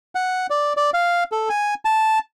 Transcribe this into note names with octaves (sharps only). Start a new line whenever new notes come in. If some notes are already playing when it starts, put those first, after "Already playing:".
F#5
D5
D5
F5
A4
G#5
A5